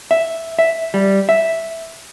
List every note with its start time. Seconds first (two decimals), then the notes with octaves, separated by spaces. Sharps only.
0.11 E5
0.59 E5
0.94 G3
1.29 E5